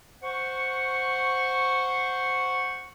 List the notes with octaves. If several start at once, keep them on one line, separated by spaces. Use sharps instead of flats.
C5 F#5 C#6